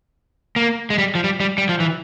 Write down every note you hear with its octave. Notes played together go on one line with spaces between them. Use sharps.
A#3
G#3
G3
F3
G3
G3
G3
F3
E3